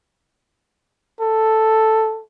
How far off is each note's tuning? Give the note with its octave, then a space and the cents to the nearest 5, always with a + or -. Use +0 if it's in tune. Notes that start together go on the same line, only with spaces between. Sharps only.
A4 +0